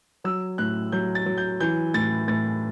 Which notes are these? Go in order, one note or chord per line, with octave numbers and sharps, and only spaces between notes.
F#3 E6
A2 F#6
F#3 G6
A6
F#3
G6
E3 G6
A2 A6
A2 A6